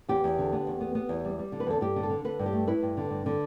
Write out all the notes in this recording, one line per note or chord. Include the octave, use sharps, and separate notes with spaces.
E2 G4
E2
D3
B3
E2
B3
B3
E2
G3
G3
D3
B4
E2 A4
G2 G4
D3
A4
D3
D3 B4
G2
G4
A3
E4 B4
G2
D3
G2
D3